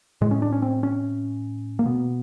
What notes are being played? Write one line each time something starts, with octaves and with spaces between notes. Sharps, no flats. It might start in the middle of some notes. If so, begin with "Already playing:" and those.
A2 G#3
C#4
D4
C#4
C4
C#4
A#3
B2 B3